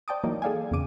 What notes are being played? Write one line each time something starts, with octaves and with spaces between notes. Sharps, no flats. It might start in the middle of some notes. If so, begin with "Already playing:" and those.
C5 D5 G5 A5 D6 D#6
E3 F#3 A#3 D#4
G#4 A4 D5 F5 G5 G#5
E2 A#2 C#3 D6 D#7